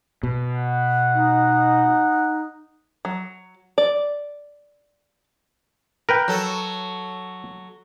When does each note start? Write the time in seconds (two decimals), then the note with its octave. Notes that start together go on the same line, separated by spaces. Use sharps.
0.23 B2
0.55 F#5
1.14 D#4
3.05 F#3
3.78 D5
6.09 A#4 B4 G5
6.28 F#3 A4